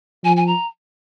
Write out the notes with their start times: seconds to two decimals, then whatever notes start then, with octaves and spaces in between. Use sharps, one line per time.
0.24 F3 G#5
0.36 G#5
0.46 A#5